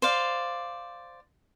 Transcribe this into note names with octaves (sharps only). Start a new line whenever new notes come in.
C5 D5 F5